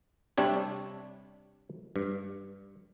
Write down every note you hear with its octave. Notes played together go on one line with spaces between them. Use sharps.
C3 G3 C4 D4 C#5
G2